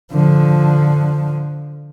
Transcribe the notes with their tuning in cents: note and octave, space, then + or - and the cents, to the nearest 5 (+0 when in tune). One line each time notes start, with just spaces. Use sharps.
D3 +0 F3 +0